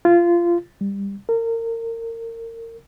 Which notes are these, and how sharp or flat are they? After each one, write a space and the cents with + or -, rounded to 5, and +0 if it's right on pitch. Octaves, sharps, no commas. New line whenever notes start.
F4 -20
G3 +20
A#4 -30